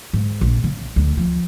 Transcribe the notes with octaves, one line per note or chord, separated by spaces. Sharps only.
G#2
A#1
C#3
D2
F3